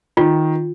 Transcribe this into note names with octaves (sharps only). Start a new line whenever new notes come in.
D#3 F4